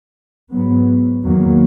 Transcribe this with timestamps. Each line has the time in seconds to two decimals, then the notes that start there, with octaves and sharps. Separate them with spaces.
0.52 G#2 F#3 B3
1.23 E2 D#3 F#3 A#3